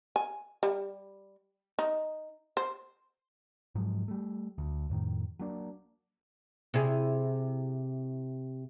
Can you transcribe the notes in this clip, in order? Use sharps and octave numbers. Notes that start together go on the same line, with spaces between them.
G#5
G3
D#4
C5
G#2 F3 F#3 G#3
G3 A3
D2
F2 A2 D#3
F#3 A#3 D4
C3 E4 G#4